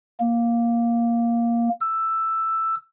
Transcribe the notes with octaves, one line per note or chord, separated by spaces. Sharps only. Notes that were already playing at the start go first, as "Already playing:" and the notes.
A#3
E6